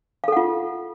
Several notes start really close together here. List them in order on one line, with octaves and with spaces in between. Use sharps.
F5 A4 F#5 F4